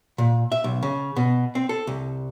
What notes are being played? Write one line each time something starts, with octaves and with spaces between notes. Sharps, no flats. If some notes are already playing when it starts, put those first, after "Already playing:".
A#2
E5
B1
C#3
B2
C4
A4
C2